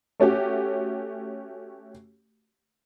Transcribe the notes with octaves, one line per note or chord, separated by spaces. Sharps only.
A3 C#4 F#4 G4